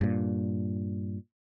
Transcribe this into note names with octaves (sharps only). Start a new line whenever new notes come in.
G2 A#2